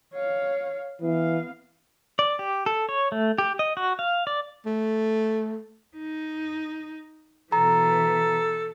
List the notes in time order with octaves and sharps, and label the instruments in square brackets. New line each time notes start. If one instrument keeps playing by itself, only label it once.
[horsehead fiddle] C#5 F5
[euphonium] E3 [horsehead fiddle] B3 F5
[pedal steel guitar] D5
G4
A4
C#5
A3
G4
D#5
F#4
F5
D5
[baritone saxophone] A3
[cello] D#4
[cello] B2 E3 [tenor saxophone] A4 [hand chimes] A#5